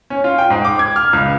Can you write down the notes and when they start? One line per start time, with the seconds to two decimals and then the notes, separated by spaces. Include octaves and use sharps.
0.10 C#4
0.24 F4
0.38 G5
0.50 G#2
0.65 D6
0.79 G#6
0.96 F6
1.13 C#2